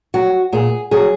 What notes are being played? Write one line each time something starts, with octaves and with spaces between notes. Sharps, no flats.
F#3 F#4
A#2 G#4
F#3 G#4